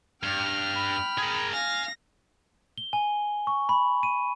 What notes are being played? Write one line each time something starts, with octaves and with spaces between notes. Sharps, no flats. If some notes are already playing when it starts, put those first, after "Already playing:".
G2 G5 F6
B5
G#4 A#4
F5 G#5 A#6
G7
G#5
C#6
B5
D#7